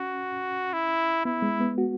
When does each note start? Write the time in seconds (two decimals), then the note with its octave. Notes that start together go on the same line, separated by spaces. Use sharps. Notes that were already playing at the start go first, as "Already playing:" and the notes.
Already playing: C#4 F#4
0.73 E4
1.25 B3 E4
1.42 G#3
1.60 B3
1.78 F#4